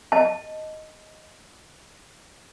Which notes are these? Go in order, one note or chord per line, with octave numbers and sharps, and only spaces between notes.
D#5 A5